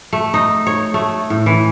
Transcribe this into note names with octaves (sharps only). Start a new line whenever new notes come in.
A3
D#4
C#5
A3
A2
E3